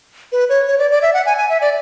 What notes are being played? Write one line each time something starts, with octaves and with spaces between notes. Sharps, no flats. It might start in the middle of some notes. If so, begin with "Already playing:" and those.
B4
C#5
C#5
D5
D5
E5
F#5
G#5
G#5
E5
D5